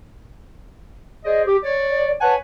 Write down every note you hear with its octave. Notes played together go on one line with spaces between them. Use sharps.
G#4 C5 D5 D#5
G4
C#5 D5
B4 C#5 F#5 G#5 A5